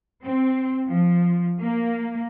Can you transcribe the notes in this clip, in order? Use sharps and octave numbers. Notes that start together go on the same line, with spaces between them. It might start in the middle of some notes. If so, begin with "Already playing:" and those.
C4
F3
A#3